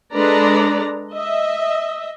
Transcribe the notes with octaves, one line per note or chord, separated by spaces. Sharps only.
G#3 D4 A4 B4 D5 A#5
D#5 E5